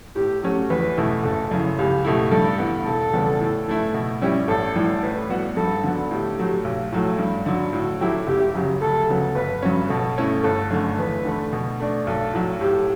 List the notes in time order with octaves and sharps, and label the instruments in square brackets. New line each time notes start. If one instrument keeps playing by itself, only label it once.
[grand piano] A2 [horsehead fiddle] G4
[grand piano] F#3 A3 C#4 F#4
[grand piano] E2 [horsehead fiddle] B4
[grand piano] B2 A3 E4
[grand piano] F#1 [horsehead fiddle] A4
[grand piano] F#2 C#3 E3
[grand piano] C#2 [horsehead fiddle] G4
[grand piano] B2 A3 E4
[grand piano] G2 [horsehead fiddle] A4
[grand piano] E3 B3
[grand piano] E1 [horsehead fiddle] A4
[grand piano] E2 C#3 G3 B3
A2
E3 A3 E4
B2
G3 C#4 E4 G4
[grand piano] A1 [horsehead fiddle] A4
[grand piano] A2 E3 G3
[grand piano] A2 [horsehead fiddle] B4
[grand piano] G3 B3 F#4
[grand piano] G2 [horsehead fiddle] A4
[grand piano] D3 F#3 B3
[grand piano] A2 [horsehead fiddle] G4
[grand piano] F#3 A3
B1
A2 F#3 A3
G2
D3 F#3
[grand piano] A2 [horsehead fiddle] F#4
[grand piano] F#3 A3 E4 G4
[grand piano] F#1 [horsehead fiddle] G4
[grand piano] F#2 C#3 F#3
[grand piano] D2 [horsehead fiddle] A4
[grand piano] C#3 F#3 B3
[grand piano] G1 [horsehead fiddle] B4
[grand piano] G2 F#3 C#4
[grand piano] B2 [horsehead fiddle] A4
[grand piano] A3 C#4 E4
[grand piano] G1 [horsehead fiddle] A4
[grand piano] F#2 D3 A3
[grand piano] E2 [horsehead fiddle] B4
[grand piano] D3 A3
B2
A3 D4
[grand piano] B1 [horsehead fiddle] A4
[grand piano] A2 F#3
[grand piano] A2 [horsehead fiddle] G4